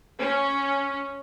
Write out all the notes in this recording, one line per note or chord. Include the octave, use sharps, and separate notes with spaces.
C#4